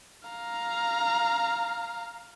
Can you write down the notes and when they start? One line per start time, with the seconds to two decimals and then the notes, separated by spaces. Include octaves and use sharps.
0.29 F5 A#5